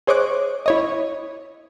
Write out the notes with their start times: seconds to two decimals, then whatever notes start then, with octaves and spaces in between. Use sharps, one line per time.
0.07 G#4 C5 C#5 D#5 D6 F#6
0.66 E4 C#5 D#5